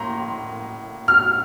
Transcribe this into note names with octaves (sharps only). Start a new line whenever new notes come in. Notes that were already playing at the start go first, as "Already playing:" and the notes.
Already playing: A2 A#3 A#5 C6
F6